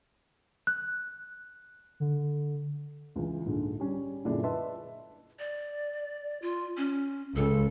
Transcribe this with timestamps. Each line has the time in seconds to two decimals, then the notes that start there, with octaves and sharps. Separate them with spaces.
0.67 F#6
2.00 D3
3.16 C#2 E3
3.45 A#1 G#2 D3
3.80 G3 C#4
4.25 F#2 A#2 D3 G#3 D4 E4
4.43 B4 D#5 E5 A5 C6
5.39 D5
6.42 F4
6.77 C#4
7.36 C#2 A4